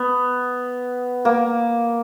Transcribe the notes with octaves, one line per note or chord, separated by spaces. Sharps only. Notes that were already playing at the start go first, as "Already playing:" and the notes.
Already playing: B3
A#3